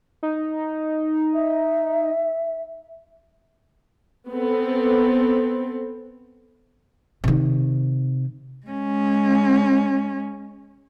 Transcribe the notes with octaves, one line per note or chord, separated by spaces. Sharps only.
D#4
E5
B3 C4 A4
C3 D#3
G#3 C#4